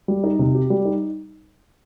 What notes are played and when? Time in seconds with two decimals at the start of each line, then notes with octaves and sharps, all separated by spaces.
0.08 G3
0.24 D#4
0.39 C3
0.55 G4
0.70 G3
0.85 D#4